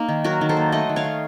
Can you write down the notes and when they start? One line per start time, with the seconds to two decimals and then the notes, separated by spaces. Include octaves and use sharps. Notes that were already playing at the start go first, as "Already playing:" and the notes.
Already playing: A#3 D#4
0.08 D#3
0.24 F#3 F#4 A#4
0.41 D#3
0.49 A4 C5
0.57 A#3
0.72 A3 D#5 F#5
0.89 D#3
0.96 C#5 F5
1.04 D#3